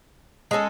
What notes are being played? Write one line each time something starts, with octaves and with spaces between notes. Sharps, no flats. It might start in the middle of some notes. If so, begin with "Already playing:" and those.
G#3 C#4 F4 A4